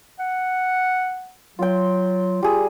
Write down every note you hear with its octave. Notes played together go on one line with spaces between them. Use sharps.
F#5
F#3 F4 G5
G3 F4 G#4